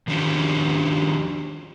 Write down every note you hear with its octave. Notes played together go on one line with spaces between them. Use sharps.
D#3 F3 C#4 D4 F#4 G4